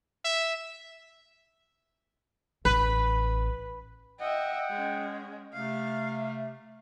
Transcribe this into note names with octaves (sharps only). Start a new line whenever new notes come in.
E5
A1 B4
D#5 E5 F#5 G5
G#3 C#4
C3 A3 F5